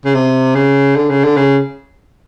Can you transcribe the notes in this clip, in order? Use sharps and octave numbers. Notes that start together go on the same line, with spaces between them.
C#3
C3
C#3
D3
C#3
D3
C#3